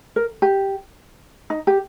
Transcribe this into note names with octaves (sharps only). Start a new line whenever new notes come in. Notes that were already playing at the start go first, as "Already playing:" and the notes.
A#4
G4
D#4
G4